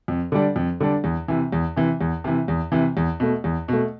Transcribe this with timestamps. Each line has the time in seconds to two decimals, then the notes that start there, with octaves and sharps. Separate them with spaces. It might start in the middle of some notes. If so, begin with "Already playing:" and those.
0.08 F2
0.32 D3 G3 D4
0.56 F2
0.80 D3 G3 D4
1.04 E2
1.28 C3 E3
1.53 E2
1.77 C3 E3
2.01 E2
2.24 C3 E3
2.48 E2
2.72 C3 E3
2.97 E2
3.20 B2 A3
3.44 E2
3.68 B2 A3